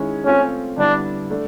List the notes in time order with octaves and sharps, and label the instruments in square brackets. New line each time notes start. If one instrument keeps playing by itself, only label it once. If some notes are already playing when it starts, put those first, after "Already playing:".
Already playing: [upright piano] D#3 G#3 C#4 E4 G#4
[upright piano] A3 C4 F4 [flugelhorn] C#4
[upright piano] D3 G3 B3 E4 [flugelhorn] D4
[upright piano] A3 D4